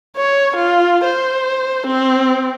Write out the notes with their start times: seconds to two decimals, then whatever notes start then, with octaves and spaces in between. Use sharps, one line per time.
0.16 C#5
0.56 F4
1.04 C5
1.86 C4